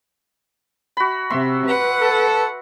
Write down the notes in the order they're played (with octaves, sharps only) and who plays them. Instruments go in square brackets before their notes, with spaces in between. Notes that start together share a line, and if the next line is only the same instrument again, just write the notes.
[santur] F#4 B5
[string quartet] C3 [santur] E5 C6
[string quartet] B4 F#5
[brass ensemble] A4